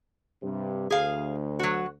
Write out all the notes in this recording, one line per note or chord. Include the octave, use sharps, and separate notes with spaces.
G2 C3
D2 G#4 F5
F#3 F#4